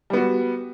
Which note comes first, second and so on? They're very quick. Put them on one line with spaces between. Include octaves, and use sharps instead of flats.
G3 B3 F#4